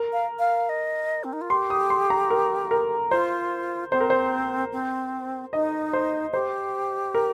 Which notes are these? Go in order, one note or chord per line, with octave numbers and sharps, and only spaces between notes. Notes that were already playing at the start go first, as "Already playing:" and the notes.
Already playing: A#4
F5
F5
D#5
C4
D#4
F4
G4 C6
D#6
C6
A#5
A#4
A#4
F4 C5
C4 C5
A#4
C5
C4
D#4 D#5
C5
G4 C5
A#4